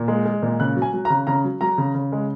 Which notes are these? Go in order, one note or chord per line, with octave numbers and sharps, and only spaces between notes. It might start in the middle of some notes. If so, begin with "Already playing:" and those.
Already playing: A#2
G#3
G#3
A#2
C#3 F#6
F#3
G#5
F#3
A#5
C#3
C#3 A#5
F#3
F#3 A#5
C#3
C#3
G#3